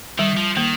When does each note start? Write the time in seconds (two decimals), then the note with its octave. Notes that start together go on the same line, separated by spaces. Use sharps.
0.19 D#3 G3
0.37 F3
0.56 D#3 A#3